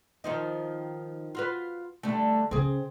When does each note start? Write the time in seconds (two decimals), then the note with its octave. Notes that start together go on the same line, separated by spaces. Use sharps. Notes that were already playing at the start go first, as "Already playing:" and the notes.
0.24 D#3 F3 D#4
1.35 F4 F#4 B4
2.03 D3 G3 A3
2.51 C#3 C4 C#4 G#4